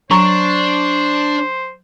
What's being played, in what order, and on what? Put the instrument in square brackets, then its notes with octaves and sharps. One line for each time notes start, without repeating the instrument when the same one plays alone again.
[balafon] F#3 A#5 [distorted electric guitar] D4 [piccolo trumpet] C5 [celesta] C#6